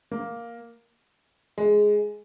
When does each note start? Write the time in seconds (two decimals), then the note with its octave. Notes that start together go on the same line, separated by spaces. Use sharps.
0.11 A#3
1.58 G#3